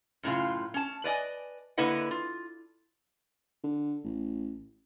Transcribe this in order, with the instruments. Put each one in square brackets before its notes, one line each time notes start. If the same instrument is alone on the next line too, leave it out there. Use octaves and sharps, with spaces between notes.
[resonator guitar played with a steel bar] F#2 A2 C#3 F4
C#4 A5
B4 D5 D#5 G#5
D3 A#3 E4 B4 D#5 F#5
F4
[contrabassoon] D3
A1